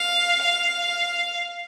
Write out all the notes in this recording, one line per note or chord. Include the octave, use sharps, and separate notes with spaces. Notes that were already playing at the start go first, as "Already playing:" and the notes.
Already playing: F5
F5